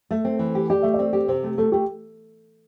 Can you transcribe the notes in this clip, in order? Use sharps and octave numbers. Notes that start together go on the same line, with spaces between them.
A3 E5
C4
E3
G4
G4 D5
A3 E5
D5
C4
G4
C3 C5
A3
A3 A4
A3 G4